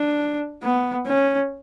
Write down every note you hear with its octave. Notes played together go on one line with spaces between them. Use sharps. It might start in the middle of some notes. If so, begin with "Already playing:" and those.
Already playing: D4
B3
C#4